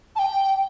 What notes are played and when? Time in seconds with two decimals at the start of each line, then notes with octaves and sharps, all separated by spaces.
0.16 A5
0.19 G5